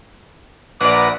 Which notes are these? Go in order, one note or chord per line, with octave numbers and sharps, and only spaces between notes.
A#1 B4 D5 F#5 A#5 D6